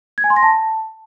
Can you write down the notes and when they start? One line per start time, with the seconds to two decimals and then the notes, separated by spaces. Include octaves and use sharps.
0.18 G#6
0.24 G#5
0.30 C6
0.36 A#6
0.43 A5